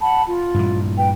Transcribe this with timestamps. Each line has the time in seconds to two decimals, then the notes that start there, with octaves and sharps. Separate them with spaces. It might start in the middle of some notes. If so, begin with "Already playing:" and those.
0.01 F#5 A5 B5
0.26 F4
0.54 G2 A#2 E3
0.96 B4 G5